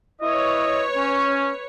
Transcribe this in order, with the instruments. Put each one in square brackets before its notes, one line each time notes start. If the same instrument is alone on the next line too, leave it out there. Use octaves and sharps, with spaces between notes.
[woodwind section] E4 D#5 [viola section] B4 C#5
[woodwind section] C#4